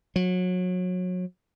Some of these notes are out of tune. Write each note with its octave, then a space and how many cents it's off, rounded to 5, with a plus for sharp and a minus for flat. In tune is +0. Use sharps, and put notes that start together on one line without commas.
F#3 -25